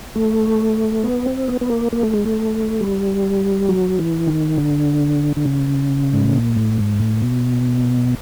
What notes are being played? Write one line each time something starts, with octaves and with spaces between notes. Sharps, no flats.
A3
B3
C4
B3
B3
A#3
A#3
A3
G#3
A3
G3
F#3
E3
D#3
D3
D3
C#3
G#2
A2
A#2
A2
G#2
A2
B2